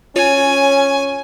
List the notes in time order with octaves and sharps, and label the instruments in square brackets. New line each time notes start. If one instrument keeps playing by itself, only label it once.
[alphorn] C#4 [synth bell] F4 C#5 [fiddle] G#5